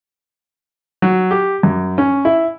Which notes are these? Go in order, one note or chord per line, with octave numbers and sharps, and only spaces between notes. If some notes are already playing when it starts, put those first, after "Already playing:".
F#3
G4
F#2
C#4
E4